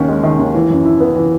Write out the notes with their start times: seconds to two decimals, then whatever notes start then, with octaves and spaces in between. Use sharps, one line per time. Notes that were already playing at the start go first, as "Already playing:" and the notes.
Already playing: D#2 D#3 C#4
0.08 G#3
0.24 D#3
0.39 D#2
0.55 E3
0.70 F#2
0.85 E4
1.00 B3
1.16 E3